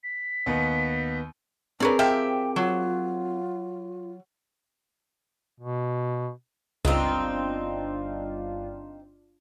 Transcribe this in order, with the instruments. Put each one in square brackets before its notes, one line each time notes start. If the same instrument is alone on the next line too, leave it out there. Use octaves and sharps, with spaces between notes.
[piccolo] B6
[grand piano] D#2 B3
[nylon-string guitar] C4 G#4 A#4 [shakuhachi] D4 [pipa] B4 C#5 D5
[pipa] F3 G4 [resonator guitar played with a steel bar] E5 [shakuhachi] G5
[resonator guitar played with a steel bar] F#3 [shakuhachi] F4
[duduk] B2
[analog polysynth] G1 D4 F4 [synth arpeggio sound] C#2 [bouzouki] C4 D#4